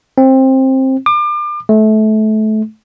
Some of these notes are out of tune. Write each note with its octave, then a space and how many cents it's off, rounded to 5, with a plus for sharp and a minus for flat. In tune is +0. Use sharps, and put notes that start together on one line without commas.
C4 +15
D6 +35
A3 -25